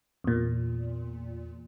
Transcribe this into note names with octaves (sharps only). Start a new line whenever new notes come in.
E2 A#2